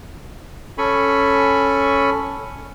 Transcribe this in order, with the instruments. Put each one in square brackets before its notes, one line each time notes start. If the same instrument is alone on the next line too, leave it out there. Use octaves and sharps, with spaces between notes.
[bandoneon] C#4 A4 G#5 B5 C#6